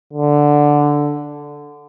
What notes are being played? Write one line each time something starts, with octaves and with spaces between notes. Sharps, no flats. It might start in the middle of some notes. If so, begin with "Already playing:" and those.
D3